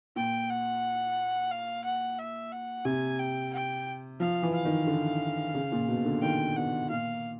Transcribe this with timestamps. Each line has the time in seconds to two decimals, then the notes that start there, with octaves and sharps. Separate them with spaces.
0.16 A#2 G5
0.49 F#5
1.51 F5
1.84 F#5
2.18 E5
2.52 F#5
2.85 C3 G#5
3.19 G5
3.53 G5
4.20 F3 F5
4.43 E3
4.54 F5
4.65 D#3
4.87 D3
5.55 C#3
5.72 A#2
5.88 B2
6.05 D3
6.22 D#3 G5
6.56 B2 F#5
6.90 A#2 F5